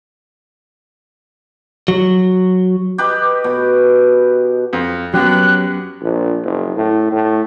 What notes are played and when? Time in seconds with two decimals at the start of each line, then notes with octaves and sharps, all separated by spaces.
1.88 F#3
2.98 G4 B4 D#5
3.44 B2
4.73 F2
5.14 F#2 F#3 B3 G4 F#6
6.02 A#1
6.44 F#1
6.77 A2
7.12 A2